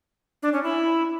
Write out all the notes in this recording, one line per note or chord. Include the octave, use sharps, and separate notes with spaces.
D4
C#4
E4